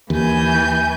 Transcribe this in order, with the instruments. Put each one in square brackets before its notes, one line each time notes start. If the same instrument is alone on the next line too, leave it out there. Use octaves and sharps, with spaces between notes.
[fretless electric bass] D#2 [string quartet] E3 G#5 G6